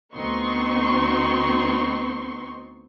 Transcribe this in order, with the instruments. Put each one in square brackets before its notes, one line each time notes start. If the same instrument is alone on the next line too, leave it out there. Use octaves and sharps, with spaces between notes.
[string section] D2 B3 C4 D#4 C6 C#6